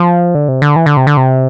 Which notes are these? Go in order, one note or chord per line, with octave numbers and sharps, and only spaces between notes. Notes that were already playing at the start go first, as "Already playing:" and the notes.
Already playing: F3
D3
C3
D3
E3
D3
C3
D3
C3